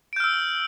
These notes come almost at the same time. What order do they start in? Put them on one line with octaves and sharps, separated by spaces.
D7 G6 F6 E6